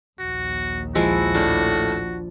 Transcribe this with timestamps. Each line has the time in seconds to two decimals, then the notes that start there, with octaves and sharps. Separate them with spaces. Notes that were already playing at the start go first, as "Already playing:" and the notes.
0.20 A#1 D#2 F#4
0.95 F3 G#3 E4 F#4
1.34 A2 D4